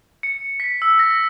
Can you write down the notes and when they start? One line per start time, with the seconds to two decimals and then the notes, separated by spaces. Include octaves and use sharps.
0.23 C#7
0.60 B6
0.82 E6
0.99 A#6